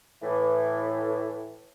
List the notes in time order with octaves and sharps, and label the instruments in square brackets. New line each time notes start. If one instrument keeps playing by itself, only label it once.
[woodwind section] A2 E3